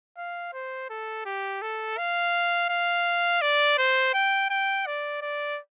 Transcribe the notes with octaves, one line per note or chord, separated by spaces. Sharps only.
F5
C5
A4
G4
A4
F5
F5
D5
C5
G5
G5
D5
D5